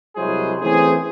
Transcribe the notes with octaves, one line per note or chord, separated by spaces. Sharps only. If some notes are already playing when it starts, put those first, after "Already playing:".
C2 F#3 G#3 E4 G#4 C5
E3 A3 C4 C#4 G#4